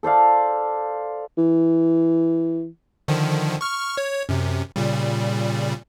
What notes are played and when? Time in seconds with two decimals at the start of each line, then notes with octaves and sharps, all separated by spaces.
0.03 A4 C5 D5 F5
1.38 E3
3.08 D3 D#3 F3
3.61 C#6 F6
3.97 C#5
4.29 F#2 C3
4.76 A#2 C#3 G3